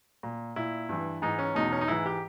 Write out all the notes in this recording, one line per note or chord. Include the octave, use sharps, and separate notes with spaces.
A#2
A#2 E4
G2 E3
G#2 E3 D#4
C#4
E2 B2 D#4
C#4
D#4
G#2 E3 E4
G4